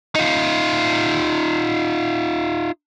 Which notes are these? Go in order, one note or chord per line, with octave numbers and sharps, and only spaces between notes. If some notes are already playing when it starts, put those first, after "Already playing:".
D#4 F4